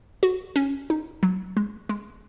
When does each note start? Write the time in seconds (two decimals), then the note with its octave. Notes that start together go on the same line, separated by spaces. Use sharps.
0.23 F#4
0.56 C#4
0.90 D#4
1.23 F#3
1.57 G#3
1.89 G#3